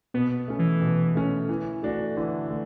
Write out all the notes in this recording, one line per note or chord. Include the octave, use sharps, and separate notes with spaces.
B2 B3
A3 C#4
E3
B2
A3 C#4
E3
A3 D4 F#4
D3 E3
A3